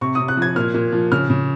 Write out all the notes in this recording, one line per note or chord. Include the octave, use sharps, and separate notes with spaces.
C3 C#6
C3 D#6
F#6
F3 G#6
A#2 F6
A#2
F3
C#3 F6
C#3